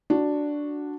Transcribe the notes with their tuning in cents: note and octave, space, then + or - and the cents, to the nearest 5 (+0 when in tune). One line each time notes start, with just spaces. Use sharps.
D4 +0 F#4 -5